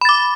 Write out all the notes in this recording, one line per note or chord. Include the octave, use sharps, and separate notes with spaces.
B5 D6 A6